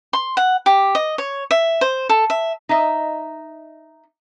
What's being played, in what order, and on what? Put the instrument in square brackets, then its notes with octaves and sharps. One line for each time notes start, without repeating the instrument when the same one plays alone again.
[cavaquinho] C6
F#5
G4
D#5
C#5
E5
C5
A4
E5
[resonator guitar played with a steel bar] D#4 D#5 E5